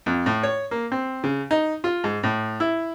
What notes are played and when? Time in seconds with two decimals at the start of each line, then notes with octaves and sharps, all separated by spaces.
0.06 F2
0.26 A2
0.43 C#5
0.71 A#3
0.92 C4
1.24 C#3
1.51 D#4
1.84 F4
2.04 G#2
2.23 A2
2.60 E4